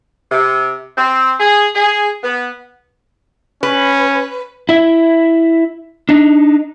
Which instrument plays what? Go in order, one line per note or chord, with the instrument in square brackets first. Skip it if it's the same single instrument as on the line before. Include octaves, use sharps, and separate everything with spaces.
[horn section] C3
C4
G#4
G#4
B3
[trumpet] C#4 [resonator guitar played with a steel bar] B4
[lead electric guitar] E4 E5
D4 D#4